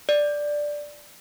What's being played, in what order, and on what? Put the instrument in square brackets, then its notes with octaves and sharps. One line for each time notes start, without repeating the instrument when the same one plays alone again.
[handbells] D5